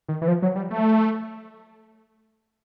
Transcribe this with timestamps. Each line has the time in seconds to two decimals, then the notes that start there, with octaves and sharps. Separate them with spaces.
0.08 D#3
0.22 E3
0.28 F3
0.42 F#3
0.56 G3
0.71 A3